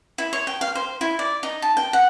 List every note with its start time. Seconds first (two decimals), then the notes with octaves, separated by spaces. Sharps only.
0.18 E4
0.33 C#5
0.47 G5
0.61 F5
0.75 C5
1.01 E4
1.19 D5
1.43 D#4
1.62 A5
1.77 G5
1.93 F#5